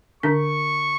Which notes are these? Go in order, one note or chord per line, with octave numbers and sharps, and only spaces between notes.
D3 D4 C#6